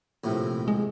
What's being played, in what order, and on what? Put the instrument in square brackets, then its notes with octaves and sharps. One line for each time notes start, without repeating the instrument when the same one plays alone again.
[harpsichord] A#1 A2 C3
[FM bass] G#3